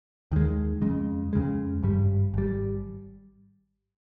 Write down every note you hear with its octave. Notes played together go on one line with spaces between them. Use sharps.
D#2 D#3 G#3
F2 C#3 G#3
F2 C#3 G#3
G#1 G2 G3
G#1 G3